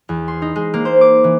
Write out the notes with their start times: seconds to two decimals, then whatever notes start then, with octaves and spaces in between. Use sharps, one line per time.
0.09 E2
0.28 C6
0.42 D#4
0.56 G#3
0.74 A#3
0.85 C5
1.01 D6
1.24 E3